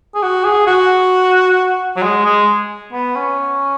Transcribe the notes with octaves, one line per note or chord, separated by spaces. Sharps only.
G#4
F#4
G#4
F#4
F#3
G#3
G#3
B3
C#4